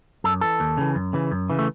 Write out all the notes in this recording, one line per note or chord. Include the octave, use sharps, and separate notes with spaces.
F#2 A4
E3 A4
D#2
C#3 E3
F#2
C#3 E3
F#2
C#3 E3
A3